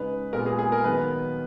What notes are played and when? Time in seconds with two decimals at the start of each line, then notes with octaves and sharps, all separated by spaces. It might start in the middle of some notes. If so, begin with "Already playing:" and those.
Already playing: C#3 G#3 D#4 B4
0.33 A#2 G#3 B3 A#4
0.46 G#4
0.59 G#4
0.72 A#4
0.84 D#3 F#3 B3 B4